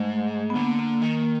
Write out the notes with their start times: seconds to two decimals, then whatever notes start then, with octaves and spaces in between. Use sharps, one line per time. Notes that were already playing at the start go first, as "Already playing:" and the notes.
Already playing: G#2 A3
0.50 B3
0.55 D3 A#3
0.79 A#3
1.02 D#3